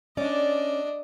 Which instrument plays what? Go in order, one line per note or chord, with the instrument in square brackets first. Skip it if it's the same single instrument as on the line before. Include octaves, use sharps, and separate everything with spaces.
[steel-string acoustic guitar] C#4 D5 [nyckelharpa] D4 D#5